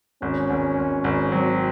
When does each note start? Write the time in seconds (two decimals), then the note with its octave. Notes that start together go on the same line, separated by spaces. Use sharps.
0.22 G#1 C#4
0.50 G#1
0.78 G#1
1.04 G#1
1.32 F#3 C4